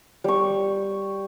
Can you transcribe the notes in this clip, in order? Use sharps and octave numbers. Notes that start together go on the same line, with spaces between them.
G3 C#6